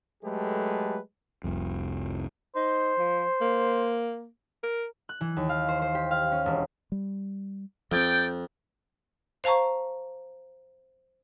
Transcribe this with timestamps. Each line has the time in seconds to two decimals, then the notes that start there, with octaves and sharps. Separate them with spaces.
0.24 F#3 G#3 A3 G4 A4 B4
1.44 F1 C2 F2
2.56 D#4 C5
2.99 F3
3.41 A#3
4.63 A#4
5.09 F#6
5.21 E3
5.37 D#2
5.49 F5
5.69 C5
5.82 C5
5.95 G4
6.11 F5
6.32 C#4
6.46 E1
6.92 G3
7.92 F2 F3 C4 D5 G5
9.44 C5 F5 A5 A#5 C#6